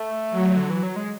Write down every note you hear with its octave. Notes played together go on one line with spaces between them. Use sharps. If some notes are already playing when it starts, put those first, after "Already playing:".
Already playing: A3
F#3
D3
E3
F#3
G#3